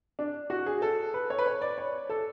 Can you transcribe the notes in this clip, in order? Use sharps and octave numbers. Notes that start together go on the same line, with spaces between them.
D4
F#4
G#4
A4
B4
C#5
B4
C#5
D5
C#5
A4